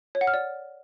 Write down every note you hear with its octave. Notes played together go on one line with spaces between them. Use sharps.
C#5
F#5
F6
D5